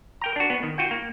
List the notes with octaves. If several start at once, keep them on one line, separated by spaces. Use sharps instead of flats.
A#4 G5 A#5
D4 F#4
B3
D#3
F4 F#4 G5
A#3